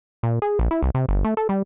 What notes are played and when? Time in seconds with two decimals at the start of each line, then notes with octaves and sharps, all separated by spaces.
0.23 A#2
0.42 G#4
0.59 A#1
0.71 E4
0.83 C2
0.95 C3
1.09 G1
1.25 A3
1.37 A4
1.49 G3